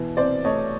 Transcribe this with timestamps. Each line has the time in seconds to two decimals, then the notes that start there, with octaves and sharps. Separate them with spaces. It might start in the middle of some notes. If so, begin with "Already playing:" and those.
Already playing: B2 E3
0.17 C3 C5 D5
0.45 A3 C#5 D#5